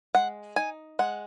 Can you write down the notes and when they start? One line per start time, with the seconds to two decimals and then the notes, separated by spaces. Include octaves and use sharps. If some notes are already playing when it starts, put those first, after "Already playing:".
0.15 G#3 F#5
0.56 D#4 G#5
0.99 G#3 F#5